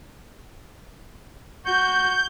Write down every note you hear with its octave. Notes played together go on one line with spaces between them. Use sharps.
F#4 G6